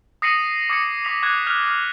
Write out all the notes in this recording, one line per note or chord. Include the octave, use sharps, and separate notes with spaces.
D#6 A#6 C7 C#7 D#7 F#7
D6 D#6 G#6 A#6 C#7
D6 B6 F7
D6 F#6 G#6
F6 F#6 F7
F6